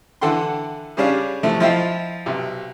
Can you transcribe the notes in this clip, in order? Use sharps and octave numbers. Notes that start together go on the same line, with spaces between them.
D3 E3 A4 F#5 G5 C6
C#3 G3 C#4 D4 F5
C3 E3 F3 A3
F3 E4 F4 D#5 E5 G5
B1 C3